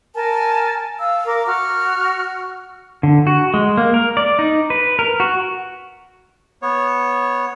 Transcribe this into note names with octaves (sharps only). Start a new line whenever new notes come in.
A#4 G#5 A5
F5 E6
A#4 D6
F#4 F6
D3
F#4
G#3
A#3
A#4
D5
D#4
B4
A#4
F#4
B3 C#5